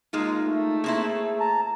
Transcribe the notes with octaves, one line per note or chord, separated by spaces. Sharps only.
G#3 A#3 D#4 F4
A3
A#3 C4 E4 G#4
A5 A#5